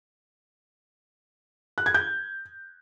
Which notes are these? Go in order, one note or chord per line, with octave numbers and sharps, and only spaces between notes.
F#6
G#6
G6